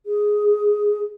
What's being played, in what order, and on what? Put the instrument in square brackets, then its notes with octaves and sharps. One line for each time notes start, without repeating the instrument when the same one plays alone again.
[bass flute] G#4